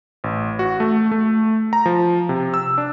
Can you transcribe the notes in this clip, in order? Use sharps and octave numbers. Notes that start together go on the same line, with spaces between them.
A1
F#4
A3
A3
A#5
F3
C3
E6
D4